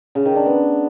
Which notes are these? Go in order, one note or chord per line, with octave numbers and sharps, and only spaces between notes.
C#3
D#3
D4
B3